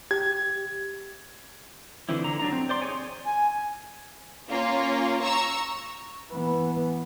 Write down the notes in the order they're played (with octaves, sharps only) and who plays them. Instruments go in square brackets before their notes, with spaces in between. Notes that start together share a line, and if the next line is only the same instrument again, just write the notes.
[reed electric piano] G4 [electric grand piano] G#6
[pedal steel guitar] D3 E3 F3 C4 E4
D3 A#5
F#3 D4 A#5
C4
C5 D5 C6
D#4 G4 G#4 C#5 G#5
[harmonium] G#5
[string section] A#3 C#4 F4
A#5 C#6 E6
[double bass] E3 B3